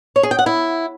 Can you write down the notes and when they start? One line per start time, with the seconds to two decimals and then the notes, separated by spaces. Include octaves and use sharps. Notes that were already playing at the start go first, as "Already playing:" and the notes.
0.16 C#5
0.23 G#4
0.31 G5
0.39 F#5
0.46 E4